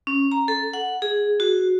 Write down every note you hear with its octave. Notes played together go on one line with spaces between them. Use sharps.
C#4
A#5
A4
F#5
G#4
F#4